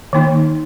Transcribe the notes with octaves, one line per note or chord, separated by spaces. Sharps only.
D#3 A#3 D#4